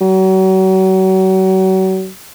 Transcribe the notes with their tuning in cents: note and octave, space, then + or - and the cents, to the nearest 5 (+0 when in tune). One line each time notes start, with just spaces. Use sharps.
F#3 +35